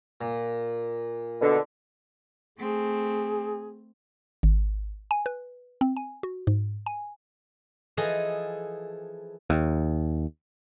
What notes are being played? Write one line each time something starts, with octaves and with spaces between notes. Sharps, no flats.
A#2
B2 D3
A3 C4 G#4
G#1
G#5
B4
C4
G#5
F#4
G#2
G#5
E3 F3 G#4 A4 D#5
D#2